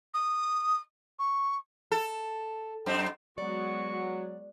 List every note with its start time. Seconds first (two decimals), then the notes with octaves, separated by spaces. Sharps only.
0.14 D#6
1.19 C#6
1.92 A4
2.86 F#2 C4
3.38 F#3 G#3 B3 F#4 D5 C#6